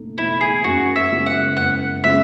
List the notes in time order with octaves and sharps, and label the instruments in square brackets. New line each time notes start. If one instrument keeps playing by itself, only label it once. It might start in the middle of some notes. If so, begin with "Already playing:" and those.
Already playing: [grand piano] F#1 B2 A3 D#4
[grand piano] E2 B2 A3 D#4 [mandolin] E4
[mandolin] G#4
[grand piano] F#2 [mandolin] F#4
[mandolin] E5
[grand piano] C#3 G#3 B3 E4
[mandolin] F#5
[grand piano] F#2 [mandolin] F#5
[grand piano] C#3 G#3 B3 E4 [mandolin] E5